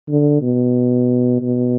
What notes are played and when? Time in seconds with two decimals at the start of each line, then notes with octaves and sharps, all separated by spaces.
0.08 D3
0.42 B2
1.41 B2